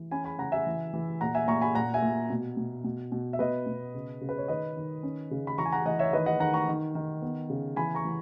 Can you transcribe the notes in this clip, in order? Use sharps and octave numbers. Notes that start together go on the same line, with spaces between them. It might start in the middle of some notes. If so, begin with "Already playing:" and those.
Already playing: E3
C#4 G#5 B5
G#5 B5
C#3 F#5 A#5
E5 G#5
E3
E3
A#2 F#5 A#5
E5 G#5
A#2 A#5 C#6
G#5 B5
A#2 F#5 A#5
E5 G#5
A#2
B2
B2
B2
B2
E5
B2 B4 D#5
B2
C#3
C#3
B4
C#5
D#3 B4 D#5
D#3
C#4
C#3
B5
E3 A#5 C#6
G#5
F#5 A#5
E3 D#5 F#5
C#5 E5
D#3 B4 D#5
D#5 F#5
D#3 F#5 A#5
A#5 C#6
D#3
D#3
B3
C#3
E3 G#5 B5
A#5 C#6
E3